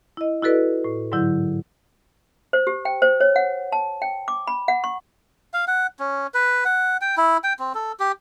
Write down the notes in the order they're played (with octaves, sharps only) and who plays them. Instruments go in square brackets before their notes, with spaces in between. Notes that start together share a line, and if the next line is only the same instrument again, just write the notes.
[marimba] E4 D#5
E4 F#4 A4 B4 D5 D#5
A2
G#2 D3 F#3 E4 G6
[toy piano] C5
G4
G5
C5
C#5
F#5
A5
G5
D6
B5
F#5
C#6
[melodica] F5
F#5
C#4
B4
F#5
G5
E4
G5
C4
A4
G4